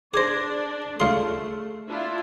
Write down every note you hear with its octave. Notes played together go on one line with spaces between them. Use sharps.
D4 G#4 C5 D5 D6 G#6 A#6
C#2 A3 G#4 F5 C6 F6
D4 E4 F4